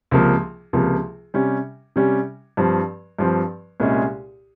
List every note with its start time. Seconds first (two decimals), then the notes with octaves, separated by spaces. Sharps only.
0.11 C#2 C3 F3 A#3
0.73 C#2 C3 F3 A#3
1.34 C3 G3 C#4
1.96 C3 G3 C#4
2.57 G2 F3 C4
3.19 G2 F3 C4
3.80 C2 A#2 G#3 C#4 G#4